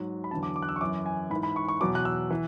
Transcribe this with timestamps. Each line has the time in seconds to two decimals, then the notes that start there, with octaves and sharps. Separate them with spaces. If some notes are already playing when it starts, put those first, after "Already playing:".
Already playing: G#2 F#3
0.24 B5
0.31 E2 D3 F#3 A5
0.43 D6
0.56 D6
0.63 F#6
0.69 E6
0.76 C#6
0.81 F#2 E3 D6
1.06 G#5
1.30 G#2 B5
1.36 E3
1.43 B5
1.56 C#6
1.68 C#6
1.81 E2 B2 F#3 D6
1.95 F#6
2.05 E6
2.30 E3